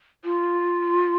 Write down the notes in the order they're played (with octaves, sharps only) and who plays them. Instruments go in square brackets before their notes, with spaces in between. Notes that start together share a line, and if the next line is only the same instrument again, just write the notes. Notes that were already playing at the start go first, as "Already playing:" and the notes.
[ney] F4